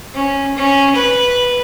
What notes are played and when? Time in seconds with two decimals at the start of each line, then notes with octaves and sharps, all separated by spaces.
0.15 C#4
0.57 C#4
0.95 B4